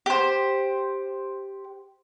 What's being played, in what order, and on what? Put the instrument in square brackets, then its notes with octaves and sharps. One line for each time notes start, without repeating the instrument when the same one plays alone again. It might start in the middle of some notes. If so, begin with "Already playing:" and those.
[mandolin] G4 C5